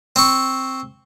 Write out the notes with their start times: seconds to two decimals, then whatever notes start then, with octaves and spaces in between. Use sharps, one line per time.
0.16 C4 C#6